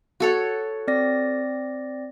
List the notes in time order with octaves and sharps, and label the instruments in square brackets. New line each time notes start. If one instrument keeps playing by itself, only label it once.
[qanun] F#4 A4 C#5
[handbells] C4 D5 A#6